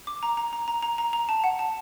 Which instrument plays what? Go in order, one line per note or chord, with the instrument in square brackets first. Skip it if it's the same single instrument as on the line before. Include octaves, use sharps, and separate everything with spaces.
[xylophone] D6
A#5
A#5
A#5
A#5
A#5
A#5
A#5
A5
F#5
A5